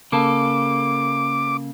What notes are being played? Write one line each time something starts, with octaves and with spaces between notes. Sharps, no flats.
C#3 A#3 A4 D6